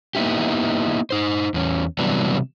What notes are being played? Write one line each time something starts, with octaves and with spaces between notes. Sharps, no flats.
A#3 B3 D#4 E4 G4
D#4 C5
E2 C#4
C3 E3 F#3 G3 B3 D4